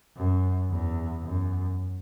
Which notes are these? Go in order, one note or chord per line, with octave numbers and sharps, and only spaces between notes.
F#2
E2
F#2